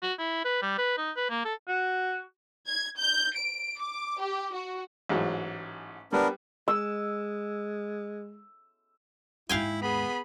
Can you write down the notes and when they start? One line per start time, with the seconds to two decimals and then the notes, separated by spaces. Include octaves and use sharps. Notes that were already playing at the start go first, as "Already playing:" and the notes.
0.03 F#4
0.19 E4
0.45 B4
0.62 G3
0.78 B4
0.98 D#4
1.17 B4
1.31 A#3
1.45 A4
1.68 F#4
2.67 G#6
2.99 G6
3.35 D7
3.80 D6
4.21 G4
4.54 F#4
5.09 A1 G#2 F#3
6.13 G3 B3 D4 A#4 B4
6.68 G#3 E6
9.49 D#2 G#2 E4 F5 G5 G#5
9.82 B3 G#4 B5